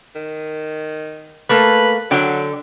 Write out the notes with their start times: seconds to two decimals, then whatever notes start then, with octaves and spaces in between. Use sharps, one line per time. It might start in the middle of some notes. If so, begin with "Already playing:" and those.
0.15 D#3
1.49 A3 A#3 A4 B4
2.11 D3 F#3 G5